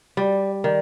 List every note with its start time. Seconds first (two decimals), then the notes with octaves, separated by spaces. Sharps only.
0.17 G3 D5
0.64 D#3 D5